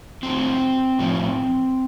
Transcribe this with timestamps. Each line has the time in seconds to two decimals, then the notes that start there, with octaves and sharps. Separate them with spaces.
0.23 A2 F#3 C4
0.99 A2 F3